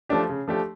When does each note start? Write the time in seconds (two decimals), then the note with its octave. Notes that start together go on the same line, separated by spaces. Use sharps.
0.09 F3 A3 D4 G4
0.29 C#3
0.48 F3 A3 D4 G4